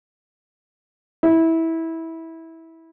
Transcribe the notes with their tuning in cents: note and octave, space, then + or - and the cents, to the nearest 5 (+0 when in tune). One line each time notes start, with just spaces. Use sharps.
E4 -15